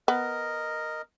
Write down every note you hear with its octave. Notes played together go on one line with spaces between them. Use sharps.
B3 A#4 D#5